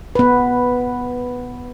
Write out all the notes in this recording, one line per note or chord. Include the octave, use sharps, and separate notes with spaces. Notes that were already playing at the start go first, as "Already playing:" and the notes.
B3 B4